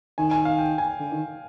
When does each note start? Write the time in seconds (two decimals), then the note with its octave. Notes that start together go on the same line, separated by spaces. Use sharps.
0.18 D#3 G#5
0.31 G#5
0.45 F5
0.58 G5
0.78 G#5
0.99 D3
1.12 D#3